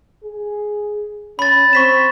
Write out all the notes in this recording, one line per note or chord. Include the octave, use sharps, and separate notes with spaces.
G#4
C#4 B5 A6
C4 C#6 B6 E7